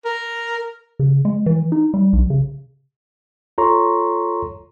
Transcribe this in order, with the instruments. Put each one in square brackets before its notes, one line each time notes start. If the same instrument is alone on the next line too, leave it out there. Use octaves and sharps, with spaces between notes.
[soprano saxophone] A#4
[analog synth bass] C#3
G#3
E3
D#4
G3
B1
C#3
[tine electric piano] F4 A4 C#5 A#5 C6 C#6